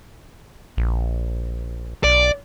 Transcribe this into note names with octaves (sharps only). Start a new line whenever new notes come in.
A#1
B1 D5